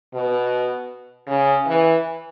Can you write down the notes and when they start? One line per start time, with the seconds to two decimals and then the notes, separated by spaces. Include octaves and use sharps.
0.14 B2
1.27 C#3
1.66 E3